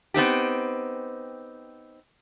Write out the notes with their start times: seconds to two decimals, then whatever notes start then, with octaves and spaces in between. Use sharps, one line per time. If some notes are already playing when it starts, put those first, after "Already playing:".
0.14 B3 C4 D#4 G4